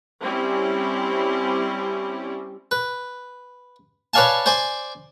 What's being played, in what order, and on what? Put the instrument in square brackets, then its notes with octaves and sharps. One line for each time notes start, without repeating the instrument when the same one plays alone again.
[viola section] G3 C4 C#4 E4 G4
[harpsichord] B4
B4 C#5 D5 F5 G#5 A5
C5 D5 G#5 D6